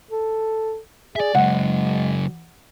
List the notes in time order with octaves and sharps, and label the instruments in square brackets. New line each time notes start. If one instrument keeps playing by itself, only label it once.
[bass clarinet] A4
[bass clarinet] G#4 [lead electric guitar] D5 E5
[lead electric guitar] C#3 F#3 [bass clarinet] G#3 [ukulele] F#5